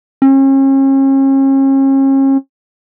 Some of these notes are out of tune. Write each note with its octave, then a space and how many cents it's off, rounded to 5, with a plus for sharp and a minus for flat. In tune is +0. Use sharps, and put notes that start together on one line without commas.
C#4 -40